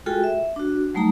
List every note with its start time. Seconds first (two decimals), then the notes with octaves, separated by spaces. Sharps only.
0.06 G#3 F4 F#4 G#4 A4 G5
0.24 E5
0.56 D4 F#4
0.94 F#3 G3 A3 D#4 A#5